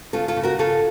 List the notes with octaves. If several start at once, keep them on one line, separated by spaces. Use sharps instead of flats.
C#3 F4 A4
F4 A4
C#3
F#4 A#4
C#3 F4 A4